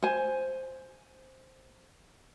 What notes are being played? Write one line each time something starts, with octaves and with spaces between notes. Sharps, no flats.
C5 G#5